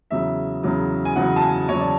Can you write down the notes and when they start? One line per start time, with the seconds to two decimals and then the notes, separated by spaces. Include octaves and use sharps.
0.11 E2 C#3 F#3 E5
0.63 E2 C#3 F#3
1.05 G#5
1.16 E2 C#3 F#3 F#5
1.36 A5
1.42 G#5
1.68 E2 C#3 F#3 C#5
1.80 D5